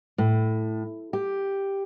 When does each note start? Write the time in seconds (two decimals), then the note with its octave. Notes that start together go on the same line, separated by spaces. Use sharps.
0.18 A2
1.13 G4